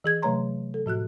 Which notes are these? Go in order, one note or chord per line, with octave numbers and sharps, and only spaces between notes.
E3 G#4 G#6
C3 F#3 A3 C#5 A#5 C6
A4
A2 F3 F#4 F#6